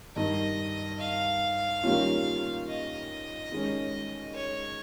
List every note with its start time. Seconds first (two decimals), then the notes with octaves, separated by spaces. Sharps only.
0.16 G2 D#3 G3 D#5
1.00 F5
1.84 D#3 G3 A#3 C#4 F4
2.67 D#5
3.52 D#3 G#3 C#4
4.35 C#5